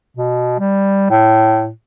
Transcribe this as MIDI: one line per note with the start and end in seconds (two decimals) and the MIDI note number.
0.17 0.58 47
0.59 1.09 55
1.10 1.69 45